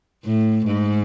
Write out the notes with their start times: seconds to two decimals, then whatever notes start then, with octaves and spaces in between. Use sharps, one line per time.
0.25 A2
0.66 G#2